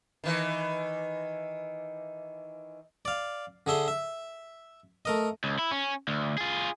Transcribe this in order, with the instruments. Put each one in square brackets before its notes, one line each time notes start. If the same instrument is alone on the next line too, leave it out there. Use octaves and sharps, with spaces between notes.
[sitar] D#3 E3
[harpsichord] D5 F5
D3 G#4 E5 C6
E5
A3 A#4 D#5
[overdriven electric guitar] C#2
E4
C#4
D2
F4 G#4